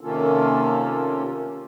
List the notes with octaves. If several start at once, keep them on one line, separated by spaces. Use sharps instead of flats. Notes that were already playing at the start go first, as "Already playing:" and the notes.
C3 D#3 A#3 C#4 F4 A4